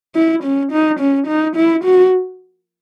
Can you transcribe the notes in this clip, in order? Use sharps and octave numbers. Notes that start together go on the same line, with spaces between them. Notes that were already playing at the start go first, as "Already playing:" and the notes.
E4
C#4
D#4
C#4
D#4
E4
F#4